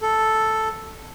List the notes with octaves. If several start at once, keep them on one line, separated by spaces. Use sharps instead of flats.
A4